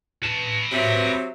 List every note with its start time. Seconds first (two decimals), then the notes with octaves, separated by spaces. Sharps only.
0.23 B4 A5
0.71 C3 F#3 C4 E5